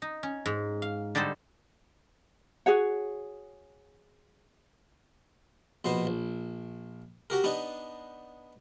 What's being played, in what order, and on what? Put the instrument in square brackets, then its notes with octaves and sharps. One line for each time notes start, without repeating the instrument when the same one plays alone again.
[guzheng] D#4
C#4
G#2
F5
D3 G3 D#4 A4 C5
[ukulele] F#4 G#4 C#5 F#5
[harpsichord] A#1 B2 B3 C5
A#1
F#4 G4 A#4
B3 D4 D#4